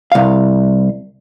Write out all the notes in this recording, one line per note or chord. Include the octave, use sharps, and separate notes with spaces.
C2 F5